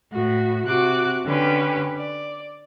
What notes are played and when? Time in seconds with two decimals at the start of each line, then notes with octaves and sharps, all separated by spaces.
0.11 A2 F#4
0.66 C3 F#4 D6 F#6
1.25 D3 C#4 G4 B4
1.98 D5